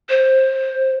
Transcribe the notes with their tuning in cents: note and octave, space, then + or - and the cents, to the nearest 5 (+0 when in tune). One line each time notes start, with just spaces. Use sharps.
C5 +15